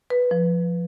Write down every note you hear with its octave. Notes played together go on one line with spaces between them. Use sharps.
B4
F3